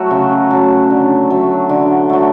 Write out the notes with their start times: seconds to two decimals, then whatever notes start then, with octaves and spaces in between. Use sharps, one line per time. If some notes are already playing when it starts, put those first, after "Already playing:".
Already playing: F#3 A3 F#4
0.11 C#3
0.50 F#3 A3
0.90 D3
1.30 F#3 A3
1.69 D3
2.09 F#3 A3